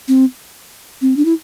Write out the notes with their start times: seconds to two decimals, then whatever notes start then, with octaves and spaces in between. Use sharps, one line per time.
0.08 C4
1.02 C4
1.17 D4
1.25 E4